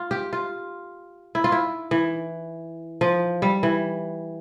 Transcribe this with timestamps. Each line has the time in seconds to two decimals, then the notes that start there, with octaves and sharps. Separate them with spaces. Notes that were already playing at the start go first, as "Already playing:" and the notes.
Already playing: F4
0.11 G4
0.33 F4
1.35 E4
1.44 F4
1.52 E4
1.91 E3
3.01 F3
3.42 G3
3.63 E3